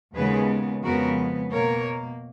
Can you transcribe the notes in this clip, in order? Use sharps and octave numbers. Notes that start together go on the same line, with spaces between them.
D#2 C#3 G#3 B3 G#4 B4
F2 C#3 G#3 B3 F#4 A#4
B2 A#3 A#4 C#5